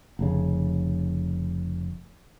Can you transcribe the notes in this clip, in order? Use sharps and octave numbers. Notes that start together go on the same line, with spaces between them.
F1 C#3